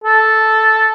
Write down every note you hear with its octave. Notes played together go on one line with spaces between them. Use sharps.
A4